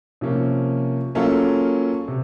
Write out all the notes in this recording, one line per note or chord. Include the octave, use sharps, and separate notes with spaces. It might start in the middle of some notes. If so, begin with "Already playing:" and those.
C3 F3 A#3 C#4
F#3 A#3 C#4 F4 A4
C3